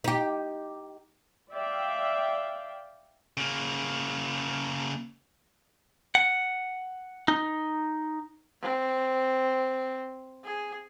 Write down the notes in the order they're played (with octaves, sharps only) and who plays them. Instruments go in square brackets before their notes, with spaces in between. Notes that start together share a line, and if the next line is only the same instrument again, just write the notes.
[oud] D#4 G4
[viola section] D5 E5 F5 G5
[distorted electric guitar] C#3 A#3
[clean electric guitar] F#5
D#4
[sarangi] C4
G#4